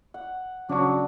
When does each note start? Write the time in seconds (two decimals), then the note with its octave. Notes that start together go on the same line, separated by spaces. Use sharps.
0.14 F#5
0.69 C#3 F#3 D4 C#6